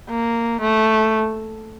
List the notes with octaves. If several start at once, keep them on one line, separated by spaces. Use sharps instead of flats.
A#3
A3